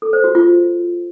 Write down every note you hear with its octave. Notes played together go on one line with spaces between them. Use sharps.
A4
C5
F#4
F4